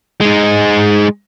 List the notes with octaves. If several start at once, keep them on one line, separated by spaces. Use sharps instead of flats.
G#3 D#4